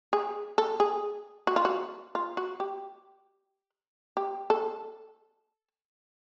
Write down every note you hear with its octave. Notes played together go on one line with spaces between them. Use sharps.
G#4
A4
G#4
F#4
F4
F#4
F4
F#4
G4
G4
A4